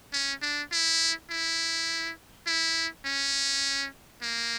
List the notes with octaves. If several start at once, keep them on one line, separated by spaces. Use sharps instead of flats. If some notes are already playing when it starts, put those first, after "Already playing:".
C#4
D4
E4
E4
E4
C#4
A#3